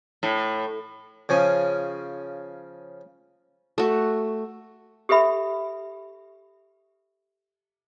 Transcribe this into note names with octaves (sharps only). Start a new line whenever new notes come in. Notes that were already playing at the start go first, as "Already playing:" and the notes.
A2
C#3 F3 C#4
A3 F#4
G4 A4 B4 E5 B5